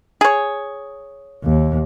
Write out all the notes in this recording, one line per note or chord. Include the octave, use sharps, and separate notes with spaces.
G#4 C#5
D#2